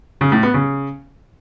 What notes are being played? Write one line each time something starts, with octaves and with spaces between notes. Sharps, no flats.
C#3
A2
B3
C#3